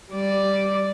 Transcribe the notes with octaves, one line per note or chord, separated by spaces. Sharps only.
G3 D5